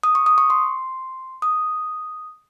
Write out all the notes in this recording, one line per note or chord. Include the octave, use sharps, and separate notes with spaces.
D#6
C#6
D#6
C#6
C6
D#6